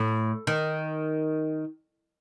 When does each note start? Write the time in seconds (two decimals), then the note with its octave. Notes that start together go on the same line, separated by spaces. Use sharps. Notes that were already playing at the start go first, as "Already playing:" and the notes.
Already playing: A2
0.47 D#3